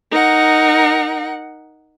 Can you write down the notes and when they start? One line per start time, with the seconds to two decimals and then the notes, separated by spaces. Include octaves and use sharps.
0.11 D#4 A#4 F#5